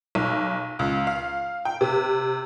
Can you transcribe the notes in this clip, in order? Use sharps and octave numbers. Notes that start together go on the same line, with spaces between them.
B1
C#2
F5
G5
C3